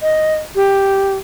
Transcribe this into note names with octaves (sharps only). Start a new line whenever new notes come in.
D#5
G4